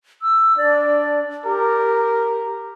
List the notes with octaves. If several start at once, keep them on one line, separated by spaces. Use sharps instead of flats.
E6
D4 D5
G4 A#4